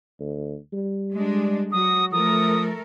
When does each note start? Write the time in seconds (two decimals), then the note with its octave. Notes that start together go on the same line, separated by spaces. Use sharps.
0.20 D2
0.73 G3
1.13 G#3 D4
1.72 F#3 F#4 D#6
2.12 F3 A3 A4 A#4 D#6